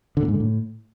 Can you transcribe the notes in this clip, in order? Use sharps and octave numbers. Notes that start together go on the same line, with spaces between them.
D3
A#2
G#2
D3
A2